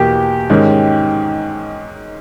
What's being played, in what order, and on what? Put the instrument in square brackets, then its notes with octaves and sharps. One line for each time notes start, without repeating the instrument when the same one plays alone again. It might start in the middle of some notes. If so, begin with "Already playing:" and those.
Already playing: [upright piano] E2 B2 A#3 [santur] G4
[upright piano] G#2 D#3 G#3 C#4